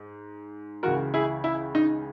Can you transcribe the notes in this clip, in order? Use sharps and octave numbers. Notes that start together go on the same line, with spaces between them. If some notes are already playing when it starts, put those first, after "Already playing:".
Already playing: G#2
C#2 C#3 E3 F#4 A#4
E4 G#4
E4
D#4